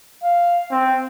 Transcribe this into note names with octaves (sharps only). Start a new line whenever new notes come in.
F5
C4